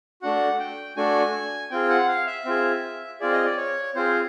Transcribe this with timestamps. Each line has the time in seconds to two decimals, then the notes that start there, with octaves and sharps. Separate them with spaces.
0.22 A3 D4 F#4 F#5
0.59 G5
0.96 A3 D4 F#4 G#5
1.71 C4 F4 G#4 G5
1.90 F#5
2.08 F5
2.27 E5
2.45 C4 F4 G#4
3.20 C4 F4 G#4 D5
3.32 D#5
3.44 D5
3.57 C#5
3.95 C4 F4 G#4 C5